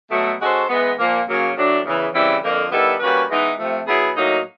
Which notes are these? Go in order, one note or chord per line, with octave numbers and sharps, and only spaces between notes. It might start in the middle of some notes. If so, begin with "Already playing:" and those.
B2 F#3 A3
G#3 C#4 F#4 A4 C5
E3 G#3 B3
A#2 F3 A#3
C#3 F#3 A#3 C#4
A2 F#3 A3 D4
E2 C#3 E3
C#3 E3 G3 C4 E4
F2 D3 F3 A#3
D#3 G3 B3 E4 A4
G3 A#3 C#4 F#4 B4
E3 G#3 B3 D#4
C3 F3 A3
F#3 B3 E4 G#4
A2 F#3 A#3 D#4